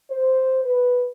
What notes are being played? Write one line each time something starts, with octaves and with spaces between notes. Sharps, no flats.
C5
B4